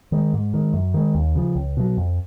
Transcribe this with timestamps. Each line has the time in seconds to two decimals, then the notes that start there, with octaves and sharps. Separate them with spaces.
0.12 D#3 G#3
0.34 G#2
0.54 D#3 G#3
0.74 F#2
0.94 D#3 G#3
1.15 D#2
1.35 C#3 F3
1.55 C#2
1.77 B2 F#3
1.97 F2